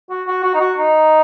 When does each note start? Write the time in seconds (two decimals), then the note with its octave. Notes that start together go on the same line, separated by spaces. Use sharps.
0.10 F#4
0.27 F#4
0.44 F#4
0.54 D#4
0.60 F#4
0.78 D#4